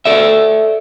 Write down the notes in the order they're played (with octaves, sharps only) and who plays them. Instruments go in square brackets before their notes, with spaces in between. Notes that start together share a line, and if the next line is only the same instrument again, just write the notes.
[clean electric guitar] A4 D5 E5